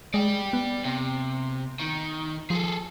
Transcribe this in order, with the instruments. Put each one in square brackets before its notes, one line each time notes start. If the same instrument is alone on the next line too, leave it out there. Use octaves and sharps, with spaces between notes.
[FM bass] G#3 [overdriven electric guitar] D5 G5
[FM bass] B3
[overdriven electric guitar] C3
D#3
[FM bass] F3 [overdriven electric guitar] G#4 A4